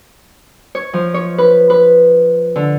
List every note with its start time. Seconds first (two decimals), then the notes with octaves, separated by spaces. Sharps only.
0.75 C#5
0.93 F3
1.14 C#5
1.38 B4
1.70 B4
2.56 D3